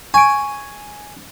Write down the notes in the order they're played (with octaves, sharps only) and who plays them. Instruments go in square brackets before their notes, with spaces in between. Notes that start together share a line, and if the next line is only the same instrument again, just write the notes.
[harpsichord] G#5 [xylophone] C#6 D7